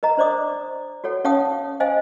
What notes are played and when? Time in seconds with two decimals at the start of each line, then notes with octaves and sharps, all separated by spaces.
0.03 A#4 D#5 A#5
0.17 D4 C5 D5 D6 D#6
1.04 F#4 A4 C#5 F#5
1.24 C#4 C#5 F5 F#5 A5 D#6
1.80 C5 D#5 F5 G#5